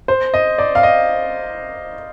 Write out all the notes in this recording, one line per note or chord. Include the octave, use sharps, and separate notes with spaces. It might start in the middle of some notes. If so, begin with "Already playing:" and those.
C5
D#5
D5
F5
D#5